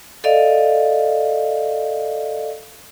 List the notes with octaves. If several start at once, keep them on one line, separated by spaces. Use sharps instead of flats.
A4 D5 D#5 F5